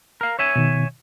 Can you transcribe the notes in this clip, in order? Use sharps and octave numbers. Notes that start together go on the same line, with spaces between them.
A#4 F5
C#5 E5 G#5
B2 D#3